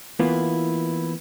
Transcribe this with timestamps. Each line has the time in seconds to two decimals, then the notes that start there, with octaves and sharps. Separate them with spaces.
0.20 E3 A#3 B3 E4 F4